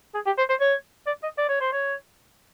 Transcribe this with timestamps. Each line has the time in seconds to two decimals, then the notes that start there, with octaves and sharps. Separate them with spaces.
0.14 G#4
0.26 G4
0.38 C5
0.49 C5
0.60 C#5
1.06 D5
1.23 D#5
1.38 D5
1.49 C#5
1.60 C5
1.72 C#5